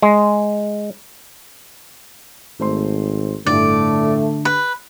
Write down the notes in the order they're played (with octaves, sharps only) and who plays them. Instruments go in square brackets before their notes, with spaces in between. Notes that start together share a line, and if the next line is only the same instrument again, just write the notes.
[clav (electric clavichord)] G#3
[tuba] G#1 [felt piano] A3 C5 C6
[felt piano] G1 A2 [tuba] D3 [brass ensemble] A3 [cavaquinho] D5
[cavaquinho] B4 [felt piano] B5